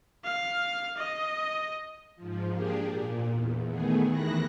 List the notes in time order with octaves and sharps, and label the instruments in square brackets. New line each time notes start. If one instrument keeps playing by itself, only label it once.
[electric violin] F5
D#5
[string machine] G#2 F3
A#3 D4 G4 G#4
A#2
E2
D#3 A3 B3 G#4
D#2 D#3 E3 E4 F#6 A#6